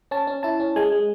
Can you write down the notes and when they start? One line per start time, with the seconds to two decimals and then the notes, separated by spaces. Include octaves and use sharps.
0.11 C#4 A5
0.27 C#4
0.43 E4 A5
0.60 C#4
0.76 G#3 G#5
0.92 G#3